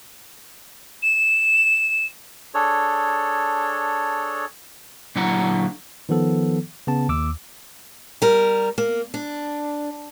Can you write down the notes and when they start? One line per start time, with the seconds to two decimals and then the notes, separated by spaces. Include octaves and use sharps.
1.02 E7
2.54 D4 G#4 A4 C#5
5.16 A#2 D3 F#3 E4 F#5 A#5
6.09 D#3 F3 B3 A4
6.87 C#3 B3 A5
7.09 D#2 D6 E6
8.22 G3 A#4
8.78 A#3
9.14 D4